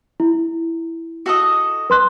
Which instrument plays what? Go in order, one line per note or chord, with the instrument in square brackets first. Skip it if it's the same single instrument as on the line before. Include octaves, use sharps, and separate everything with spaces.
[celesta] E4
[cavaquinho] F#4 A4 D#5
[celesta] B4 C6 F#6